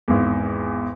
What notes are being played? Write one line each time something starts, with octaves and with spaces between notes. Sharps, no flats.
G#1 E2